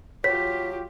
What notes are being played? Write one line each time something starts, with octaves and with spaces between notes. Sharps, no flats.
F#3 F4 G4 C#5 B6